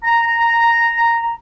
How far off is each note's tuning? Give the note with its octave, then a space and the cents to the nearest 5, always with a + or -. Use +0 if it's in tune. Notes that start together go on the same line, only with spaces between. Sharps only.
A#5 -5